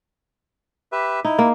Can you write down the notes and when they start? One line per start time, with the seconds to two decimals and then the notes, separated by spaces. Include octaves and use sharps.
0.92 G4 B4 E5
1.25 D#4 E4
1.39 A#3